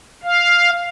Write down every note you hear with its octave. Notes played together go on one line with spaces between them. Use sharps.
F5